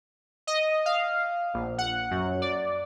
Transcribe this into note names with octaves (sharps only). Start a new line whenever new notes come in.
D#5
F5
A#1
F#5
F#2
D5